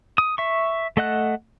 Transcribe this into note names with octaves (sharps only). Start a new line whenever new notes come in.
D#6
E5 C#6
A3 A4 D#5 F#5 F#6